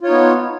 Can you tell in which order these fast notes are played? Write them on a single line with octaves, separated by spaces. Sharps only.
F4 C#5 D#4 B3